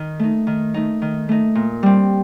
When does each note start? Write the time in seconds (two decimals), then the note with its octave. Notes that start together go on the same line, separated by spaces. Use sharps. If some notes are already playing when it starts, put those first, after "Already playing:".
Already playing: D#3
0.19 A3 D#4
0.47 D#3
0.74 A3 D#4
1.02 D#3
1.29 A3 D#4
1.55 A#2
1.83 G3 C4